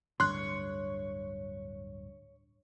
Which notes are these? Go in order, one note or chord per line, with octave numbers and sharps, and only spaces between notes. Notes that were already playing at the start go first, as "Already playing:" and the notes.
D1 G2 D3 C#5 C6 F#6